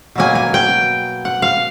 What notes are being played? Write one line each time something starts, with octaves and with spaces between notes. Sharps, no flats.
B2 F#3 A#3 G#5
G#5
G5
F#5
F5